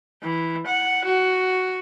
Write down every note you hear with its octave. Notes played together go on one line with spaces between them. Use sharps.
E3
F#5
F#4